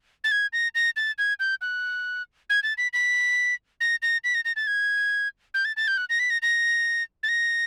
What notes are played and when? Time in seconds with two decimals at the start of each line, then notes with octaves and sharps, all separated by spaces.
0.24 A6
0.31 G#6
0.53 A#6
0.75 A#6
0.97 A6
1.18 G#6
1.40 G6
1.61 F#6
2.50 G#6
2.63 A6
2.78 B6
2.93 B6
3.81 A#6
4.02 A#6
4.24 B6
4.35 A#6
4.45 A#6
4.56 A6
4.67 G#6
5.54 G6
5.65 A6
5.77 A6
5.88 G6
5.97 F#6
6.10 A#6
6.19 B6
6.30 A#6
6.42 A#6
7.23 A6
7.29 A#6